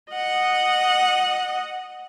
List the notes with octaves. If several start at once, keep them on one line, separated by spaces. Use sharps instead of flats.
D#5 F#5